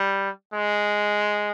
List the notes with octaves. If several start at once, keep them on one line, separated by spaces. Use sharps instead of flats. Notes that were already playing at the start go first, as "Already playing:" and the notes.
Already playing: G3
G#3